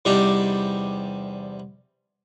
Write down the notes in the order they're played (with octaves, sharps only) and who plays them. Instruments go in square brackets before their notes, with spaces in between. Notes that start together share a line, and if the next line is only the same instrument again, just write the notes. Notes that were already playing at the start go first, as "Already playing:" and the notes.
[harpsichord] E2 C3 G3 D4 D#4